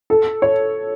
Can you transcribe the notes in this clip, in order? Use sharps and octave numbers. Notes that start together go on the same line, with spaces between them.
A4
C#5